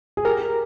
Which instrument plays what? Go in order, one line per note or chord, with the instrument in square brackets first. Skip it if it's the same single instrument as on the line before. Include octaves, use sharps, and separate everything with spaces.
[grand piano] G#4
[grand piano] G4 [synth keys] A#4